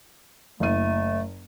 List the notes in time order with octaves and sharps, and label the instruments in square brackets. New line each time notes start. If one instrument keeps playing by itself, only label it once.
[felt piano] F#1 D#7 [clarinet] A3